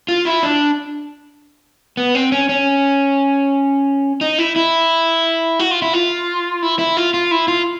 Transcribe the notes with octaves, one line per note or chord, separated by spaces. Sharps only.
F4
E4
D4
B3
C4
C#4
C#4
D#4
E4
E4
F#4
F4
E4
F4
E4
E4
F4
F4
E4
F4